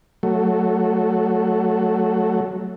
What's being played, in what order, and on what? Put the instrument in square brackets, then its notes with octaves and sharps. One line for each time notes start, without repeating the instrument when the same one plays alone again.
[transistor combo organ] F#3 A3